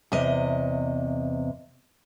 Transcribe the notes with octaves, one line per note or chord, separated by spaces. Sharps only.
E2 C3 D#5